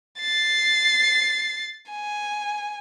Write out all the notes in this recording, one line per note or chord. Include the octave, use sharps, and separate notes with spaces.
A6 C7
G#5